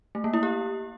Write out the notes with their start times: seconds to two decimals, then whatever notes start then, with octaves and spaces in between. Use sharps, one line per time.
0.15 A3
0.24 A#3
0.33 E4
0.43 G4